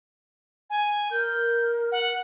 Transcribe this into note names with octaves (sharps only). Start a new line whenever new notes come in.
G#5
A#4 G6
F#5